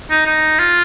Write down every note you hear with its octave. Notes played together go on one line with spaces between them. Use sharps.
D#4
D#4
F4